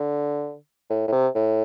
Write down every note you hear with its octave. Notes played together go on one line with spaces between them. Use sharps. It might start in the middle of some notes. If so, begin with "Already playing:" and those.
Already playing: D3
A2
A2
C3
A2